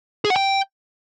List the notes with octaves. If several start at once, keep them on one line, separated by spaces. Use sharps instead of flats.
G#4
F#5
G5